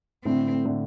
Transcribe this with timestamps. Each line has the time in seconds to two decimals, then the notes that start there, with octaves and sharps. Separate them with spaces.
0.24 A2 D3 C4
0.65 A2 D3